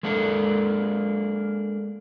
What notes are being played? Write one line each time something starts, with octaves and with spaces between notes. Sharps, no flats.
G#3 A#3 D4 A4